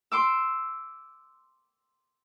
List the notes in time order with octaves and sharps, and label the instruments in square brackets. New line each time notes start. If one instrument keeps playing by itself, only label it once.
[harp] C6 D6 E6